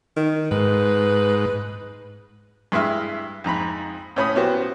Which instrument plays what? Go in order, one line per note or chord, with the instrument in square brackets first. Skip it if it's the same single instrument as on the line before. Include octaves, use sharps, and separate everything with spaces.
[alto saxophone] D#3
[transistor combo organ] G#2 [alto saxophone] B4
[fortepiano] G2 G#3 E4 E5 F6
F2 G#2 A#5 B5
A2 C#4 B5 D#6
B3 C#4 F#4 G4 C5